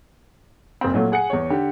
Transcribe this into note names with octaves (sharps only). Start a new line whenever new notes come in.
F#1 C4
A#2 F#3 A3
G#4 F#5 G#5 C#7
E2 C#5
D3 G4